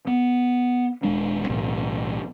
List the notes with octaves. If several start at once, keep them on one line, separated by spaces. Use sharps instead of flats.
B3
D#1 G#3 D4
B1 E2 A2